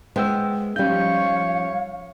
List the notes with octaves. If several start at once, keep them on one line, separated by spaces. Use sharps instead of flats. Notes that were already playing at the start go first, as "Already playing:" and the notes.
G#3 B3 E4 C5 G5 E6
F3 G3 C#4 D#4 C#5 F5 G6